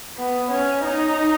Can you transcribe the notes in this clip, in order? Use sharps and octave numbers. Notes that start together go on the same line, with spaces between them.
B3
C#4
D#4